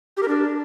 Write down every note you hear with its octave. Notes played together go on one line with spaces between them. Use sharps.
G4
A#4
D4